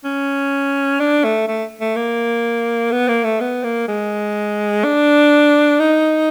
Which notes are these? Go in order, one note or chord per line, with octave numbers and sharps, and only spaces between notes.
C#4
D4
A3
A3
A3
A#3
B3
A#3
A3
B3
A#3
G#3
D4
D#4